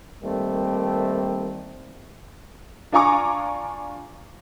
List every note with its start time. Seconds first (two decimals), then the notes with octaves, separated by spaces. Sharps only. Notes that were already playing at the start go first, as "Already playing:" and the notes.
0.23 D#3 G3 A3 A#3 C4
2.92 D4 F4 G#5 A#5 C#6 D6